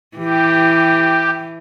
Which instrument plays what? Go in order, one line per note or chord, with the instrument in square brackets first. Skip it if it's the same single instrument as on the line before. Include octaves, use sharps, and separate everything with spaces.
[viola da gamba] E3 [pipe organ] G4